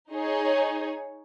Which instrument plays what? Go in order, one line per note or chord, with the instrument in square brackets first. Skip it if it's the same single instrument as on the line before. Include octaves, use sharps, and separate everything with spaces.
[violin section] D#4 G#4 C#5